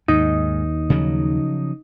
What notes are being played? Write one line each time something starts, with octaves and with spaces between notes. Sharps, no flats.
D#2 G#2 D#4
C#3 F3 F#3